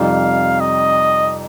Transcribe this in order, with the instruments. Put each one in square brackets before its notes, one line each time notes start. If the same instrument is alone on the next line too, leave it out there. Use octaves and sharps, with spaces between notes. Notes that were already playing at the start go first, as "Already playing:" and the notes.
Already playing: [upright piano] F2 C3 G3 C4 D#4 [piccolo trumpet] F5
[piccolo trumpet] D#5